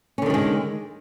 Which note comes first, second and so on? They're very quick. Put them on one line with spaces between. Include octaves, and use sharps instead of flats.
C#4 D3 D#3 G3 G#3